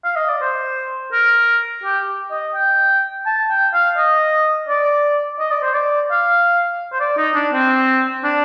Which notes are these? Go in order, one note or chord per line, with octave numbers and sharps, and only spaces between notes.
F5
D#5
D5
C5
A#4
G4
D#5
G5
A5
G5
F5
D#5
D5
D#5
D5
C5
D5
F5
C5
D5
D#4
D4
C4
D4